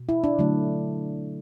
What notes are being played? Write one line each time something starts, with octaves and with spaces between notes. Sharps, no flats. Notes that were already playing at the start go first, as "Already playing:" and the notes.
Already playing: B2
E4
D4
D3 F#3 A3